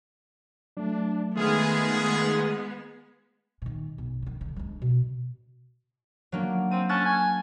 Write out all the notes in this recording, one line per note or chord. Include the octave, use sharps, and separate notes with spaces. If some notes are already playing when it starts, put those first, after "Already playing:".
F#3 A3 D4
D#3 G#3 A3 B3 F4 G#4 F6
A#2 D#3
B1 F#2
D3 D#3
D3
G#3 D4
B2
F#3 A#3 D4
C4 D#7
C#4 A5 F#6 A6
G#5